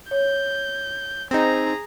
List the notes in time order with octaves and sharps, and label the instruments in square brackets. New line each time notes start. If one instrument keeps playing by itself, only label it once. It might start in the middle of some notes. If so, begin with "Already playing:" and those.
[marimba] C#5 [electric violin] G6
[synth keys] C4 D#4 [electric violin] G#4 A#5